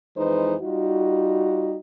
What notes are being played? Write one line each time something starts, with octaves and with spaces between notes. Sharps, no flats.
F2 E3 G#3 D#4 B4 C5
G3 D#4 F4 F#4